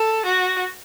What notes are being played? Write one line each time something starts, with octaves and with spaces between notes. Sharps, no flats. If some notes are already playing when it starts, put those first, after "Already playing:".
Already playing: A4
F#4